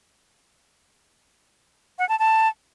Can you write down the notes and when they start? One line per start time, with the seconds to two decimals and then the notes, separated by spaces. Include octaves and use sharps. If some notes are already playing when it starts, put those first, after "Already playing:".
1.99 F#5
2.09 A5
2.19 A5